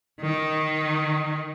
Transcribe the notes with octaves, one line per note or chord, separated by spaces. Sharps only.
D#3